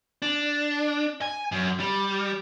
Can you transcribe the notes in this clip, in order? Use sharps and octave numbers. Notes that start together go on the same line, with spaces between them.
D4
G#5
F#2
G3